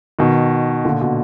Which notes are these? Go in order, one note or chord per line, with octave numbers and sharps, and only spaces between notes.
B2 D#3
A#2 D3
B2